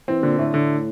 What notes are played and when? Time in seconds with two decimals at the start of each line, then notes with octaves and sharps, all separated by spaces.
0.08 E3 C4
0.23 A#2 D3
0.39 A2 A3
0.54 D3